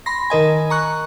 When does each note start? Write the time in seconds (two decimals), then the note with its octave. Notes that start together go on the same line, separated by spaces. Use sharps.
0.06 B5 C6 A#6
0.30 D#3 A#4 D#5 G#5
0.70 A#5 C#6 F#6